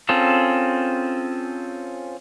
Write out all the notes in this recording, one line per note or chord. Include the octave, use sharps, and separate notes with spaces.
C4 C#4 F4 G#4 A4